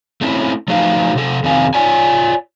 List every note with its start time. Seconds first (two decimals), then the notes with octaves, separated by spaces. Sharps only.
0.21 A3 C4 C#4 E4
0.68 F3 F#3 A3 D#4 B4 F5
1.15 C3 A4
1.44 F2 C3 D#3 C4 F5 G#5
1.74 F4 C#5 D5 G#5